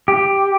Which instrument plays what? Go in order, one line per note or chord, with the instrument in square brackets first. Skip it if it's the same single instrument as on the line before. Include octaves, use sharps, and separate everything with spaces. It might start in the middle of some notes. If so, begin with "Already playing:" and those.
[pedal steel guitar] G4